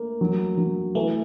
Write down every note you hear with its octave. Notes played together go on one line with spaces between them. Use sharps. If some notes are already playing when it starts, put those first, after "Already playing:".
Already playing: A3 A#3
F#3
F#3
E3 A3